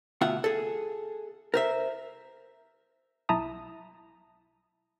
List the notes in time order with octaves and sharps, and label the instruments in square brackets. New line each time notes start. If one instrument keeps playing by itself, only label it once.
[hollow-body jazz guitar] D2 B2 F4 E5 F#5
G#4 A4
A#4 C5 E5
[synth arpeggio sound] B1 E4 E5 A5 A#5 D#6